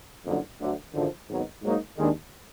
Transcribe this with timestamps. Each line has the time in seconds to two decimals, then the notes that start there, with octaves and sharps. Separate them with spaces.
0.25 F#1 F2 D3 F#3
0.59 D2 D3 F#3
0.94 G#1 F#2 D3 F3
1.28 G#1 G#2 F#3 B3 D#4
1.63 G#2 F#3 A#3 D#4
1.98 D#2 D#3 G#3 D4